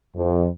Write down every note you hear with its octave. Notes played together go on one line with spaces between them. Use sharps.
F2